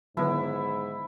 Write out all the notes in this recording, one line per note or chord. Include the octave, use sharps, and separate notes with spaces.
G#2 D3 D#3 F#3 B3 E4